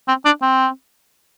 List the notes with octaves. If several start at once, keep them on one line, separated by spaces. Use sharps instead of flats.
C4
D4
C4